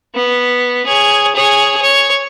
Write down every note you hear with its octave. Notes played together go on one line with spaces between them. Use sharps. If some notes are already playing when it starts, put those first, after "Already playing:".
B3
G#4 C#5
G#4 C#5
C#5